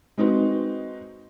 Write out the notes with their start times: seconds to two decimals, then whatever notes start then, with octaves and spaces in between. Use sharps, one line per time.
0.18 G#3 C4 D#4 F#4 B4